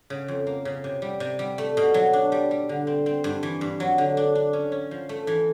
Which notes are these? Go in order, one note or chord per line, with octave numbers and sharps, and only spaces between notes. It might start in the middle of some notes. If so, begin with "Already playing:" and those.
C#3
F2
A#3
C#3
C3
G3
C3
G3
A3
B2
F#3
D4
G3
G3
D3
C4
C4
G2
E3
G2
F#3
D3
D4
D4
C#4
C#4
F3
A3
E3